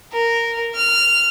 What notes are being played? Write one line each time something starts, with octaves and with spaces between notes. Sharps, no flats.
A#4
F6